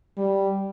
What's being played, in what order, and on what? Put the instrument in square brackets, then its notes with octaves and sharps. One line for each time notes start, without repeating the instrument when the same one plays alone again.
[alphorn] G3